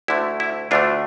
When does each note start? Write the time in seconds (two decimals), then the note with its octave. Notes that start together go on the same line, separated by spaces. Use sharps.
0.08 D2 D3 A3 E4
0.40 E4
0.71 D2 D3 A3 D4 F4